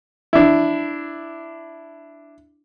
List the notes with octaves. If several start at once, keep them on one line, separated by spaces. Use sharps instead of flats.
D4 E4